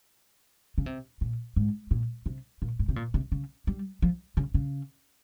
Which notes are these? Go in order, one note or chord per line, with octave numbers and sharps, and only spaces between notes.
C#3
C3
A#2
G#2
A#2
C3
A#2
G#2
C3
A#2
C3
C#3
G3
F3
C#3
C#3